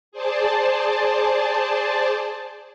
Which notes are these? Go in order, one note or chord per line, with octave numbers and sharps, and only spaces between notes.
G#4 C5 D5 A5